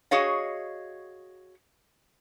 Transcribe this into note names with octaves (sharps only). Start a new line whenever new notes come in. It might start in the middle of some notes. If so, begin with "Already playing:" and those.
F#4 G#4 C#5 D#5 F5